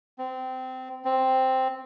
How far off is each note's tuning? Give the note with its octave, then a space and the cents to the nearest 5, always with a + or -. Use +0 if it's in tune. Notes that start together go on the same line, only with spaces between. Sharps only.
C4 -20
C4 +0